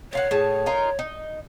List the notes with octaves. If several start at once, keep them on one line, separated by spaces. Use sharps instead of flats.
A#2 C#5 F5 F#5
A2 G#4 A5
D#4 F4 A#4
D#4